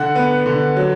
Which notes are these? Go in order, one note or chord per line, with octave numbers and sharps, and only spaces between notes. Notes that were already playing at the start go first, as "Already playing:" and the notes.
Already playing: D3 F#5
B3
D3
F#3